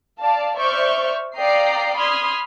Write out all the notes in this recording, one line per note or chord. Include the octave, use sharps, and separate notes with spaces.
D5 F5 A5
C5 D5 E5 C#6 F6 G6
D5 F5 G5 A#5 D#6 C7
B5 C6 D#6 F6 G#6